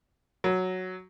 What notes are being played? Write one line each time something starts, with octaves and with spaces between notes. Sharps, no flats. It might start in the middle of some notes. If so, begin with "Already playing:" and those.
F#3